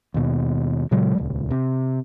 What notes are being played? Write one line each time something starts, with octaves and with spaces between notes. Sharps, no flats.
D#2 B2
A#2 C#3 F#3 G#3
D#1 C#2
C3